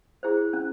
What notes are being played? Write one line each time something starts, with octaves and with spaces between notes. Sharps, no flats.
E4 G#4 C5
C#4